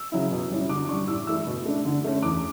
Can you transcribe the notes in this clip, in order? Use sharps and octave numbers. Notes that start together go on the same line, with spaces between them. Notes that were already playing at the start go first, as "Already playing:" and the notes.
Already playing: E6
C#3 F#3 C#4 E4
B2
G3 C#4 E4
D3 D6
D6
G3 D4 C#6
A2 E6
E3 A3 E4 E6
B2
A3 D4
D3
A3 C#4
E2 D6